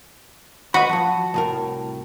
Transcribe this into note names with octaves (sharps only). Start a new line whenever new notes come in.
F#4 B4 D#5 B5
F3 F#3 A5
C2 A2 A#4